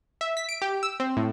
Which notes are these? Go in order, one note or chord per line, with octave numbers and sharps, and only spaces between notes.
E5
B6
D7
G4
E6
C4
A2